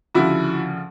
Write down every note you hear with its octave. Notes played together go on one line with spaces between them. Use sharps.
D2 C#3 F3 E4 F#4